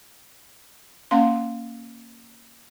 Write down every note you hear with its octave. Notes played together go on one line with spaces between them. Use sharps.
A#3 C#4 F5 C6